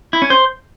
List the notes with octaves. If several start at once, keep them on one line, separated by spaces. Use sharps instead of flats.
E4
C#4
C5